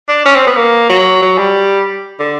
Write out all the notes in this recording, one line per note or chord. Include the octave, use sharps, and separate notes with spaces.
D4
C#4
C4
B3
A#3
F#3
F#3
G3
D3